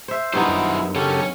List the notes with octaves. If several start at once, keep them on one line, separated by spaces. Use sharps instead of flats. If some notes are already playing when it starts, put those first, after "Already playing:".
C5 E5
G2 F#3 B3 D#4 E4 C5
F#2
C#3 C#4 G4 A4 C#5